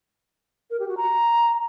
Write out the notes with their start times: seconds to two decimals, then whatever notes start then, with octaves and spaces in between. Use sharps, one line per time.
0.71 A#4
0.79 G4
0.88 F#4
0.97 A#5